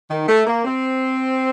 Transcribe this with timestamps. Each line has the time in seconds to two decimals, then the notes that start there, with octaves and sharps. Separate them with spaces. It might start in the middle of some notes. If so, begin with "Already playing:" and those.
0.10 D#3
0.27 A3
0.46 A#3
0.64 C4